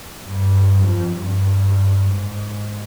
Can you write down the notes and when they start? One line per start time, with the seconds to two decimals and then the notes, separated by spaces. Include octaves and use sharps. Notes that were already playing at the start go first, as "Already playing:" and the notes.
0.23 G2
0.84 F2
1.15 G2
2.08 G#2